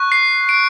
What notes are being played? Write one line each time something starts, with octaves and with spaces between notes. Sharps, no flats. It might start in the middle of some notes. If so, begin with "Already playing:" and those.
Already playing: C#6 F#6
C7
D7